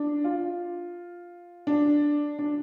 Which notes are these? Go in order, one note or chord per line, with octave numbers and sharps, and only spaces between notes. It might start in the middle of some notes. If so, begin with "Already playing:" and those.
Already playing: D4
F4
D4
D4